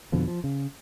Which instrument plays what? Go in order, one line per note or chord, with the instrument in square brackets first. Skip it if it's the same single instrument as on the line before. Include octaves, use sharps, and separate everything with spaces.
[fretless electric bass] F2 B2 D3 F3
F3
C#3